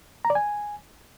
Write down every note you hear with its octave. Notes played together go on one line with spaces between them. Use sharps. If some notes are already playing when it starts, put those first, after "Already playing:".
A#5
D5
G#5